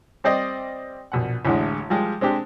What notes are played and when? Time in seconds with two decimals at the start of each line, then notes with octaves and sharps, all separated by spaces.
0.24 G3 C4 C5 D5 D#5
1.12 A#1 B2 F#5
1.45 A1 D2 A2 D3 G#3
1.90 F3 G3 G#3
2.21 G#3 C4 D4 G4